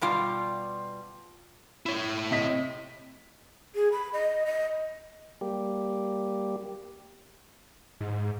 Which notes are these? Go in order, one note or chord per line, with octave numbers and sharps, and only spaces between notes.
B2 G3 F4
E4 C#5
C3 D#5 B6
G#4
B5
D#5
D#5
G3 A#3 G4
G#2